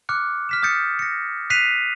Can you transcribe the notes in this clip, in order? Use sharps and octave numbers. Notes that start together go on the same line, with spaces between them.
D6 F6 F#6 C#7
F6 B6 E7
D#6 F6 G6 A6 C#7
A#6 C#7
F#6 B6 C7 D#7 F7